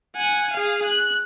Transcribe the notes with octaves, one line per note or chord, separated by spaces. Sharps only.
F#5 G#5
G#4 F5
F#6